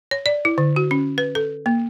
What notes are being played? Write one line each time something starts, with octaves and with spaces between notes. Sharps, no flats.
C#5
D5
E4
D3
F#4
C#4
B4
A4
A#3